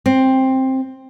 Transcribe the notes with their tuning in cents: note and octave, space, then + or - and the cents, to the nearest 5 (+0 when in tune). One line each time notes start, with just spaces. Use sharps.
C4 +10